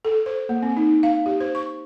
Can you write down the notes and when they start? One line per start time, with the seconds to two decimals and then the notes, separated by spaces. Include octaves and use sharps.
0.05 A4
0.26 C5
0.49 A#3
0.63 C4
0.76 D#4
1.03 F5
1.26 G4
1.40 C5
1.55 C#6